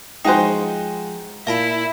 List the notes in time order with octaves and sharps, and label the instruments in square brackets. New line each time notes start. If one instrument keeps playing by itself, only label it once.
[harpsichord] F3 G#3 [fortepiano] D#4 F#4 C5 [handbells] G5 G#5
[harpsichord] A#2 [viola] E4 [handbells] F5 A5 B5